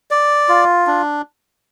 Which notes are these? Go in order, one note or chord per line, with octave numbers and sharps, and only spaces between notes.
D5
F4
D4